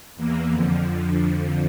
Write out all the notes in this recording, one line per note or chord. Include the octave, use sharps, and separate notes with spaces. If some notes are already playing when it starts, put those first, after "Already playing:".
E2 E3 A#3
F2 D3 F3